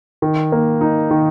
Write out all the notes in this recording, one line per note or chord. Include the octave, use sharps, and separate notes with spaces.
D#3
A#3
D#4
D#3